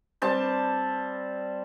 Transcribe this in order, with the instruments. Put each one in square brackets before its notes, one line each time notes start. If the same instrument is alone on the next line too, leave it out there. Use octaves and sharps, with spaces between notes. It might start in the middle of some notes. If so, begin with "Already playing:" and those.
[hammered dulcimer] G3 C4 A5